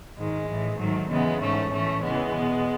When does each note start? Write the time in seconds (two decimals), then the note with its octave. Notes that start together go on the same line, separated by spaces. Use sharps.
0.17 G#2 D#3 G#3
0.49 A2 E3
0.79 G#2 D#3 F#3 A3
1.10 E2 C#3 E3 G#3 B3
1.41 G#2 E3 A3 C#4
1.72 A2 E3 A3 C#4
2.04 E2 C#3 E3 G#3 B3
2.35 E2 B2